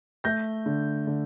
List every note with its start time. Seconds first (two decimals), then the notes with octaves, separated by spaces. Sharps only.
0.24 A3 G6 A#6
0.66 D3
1.07 D3